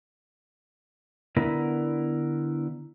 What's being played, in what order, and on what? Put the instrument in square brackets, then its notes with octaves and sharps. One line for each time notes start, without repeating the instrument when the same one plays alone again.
[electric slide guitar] D3 B3 E4 A#4